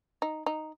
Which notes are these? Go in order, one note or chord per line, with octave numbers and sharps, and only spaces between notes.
D#4
D#4